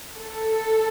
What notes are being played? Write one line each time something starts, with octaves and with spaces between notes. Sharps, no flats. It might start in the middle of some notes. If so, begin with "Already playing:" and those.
A4